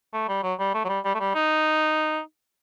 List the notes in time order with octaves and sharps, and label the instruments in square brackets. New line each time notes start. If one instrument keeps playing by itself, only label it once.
[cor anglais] A3
G3
F#3
G3
A3
F#3
G3
G3
A3
G3
D#4